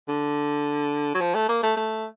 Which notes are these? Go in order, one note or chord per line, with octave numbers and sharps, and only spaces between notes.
D3
F#3
F3
A3
A#3
A3
A3